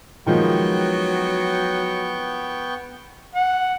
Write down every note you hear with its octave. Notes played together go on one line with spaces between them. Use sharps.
D#3 F3 F#3 G#3 B3 G5 C#6
F#5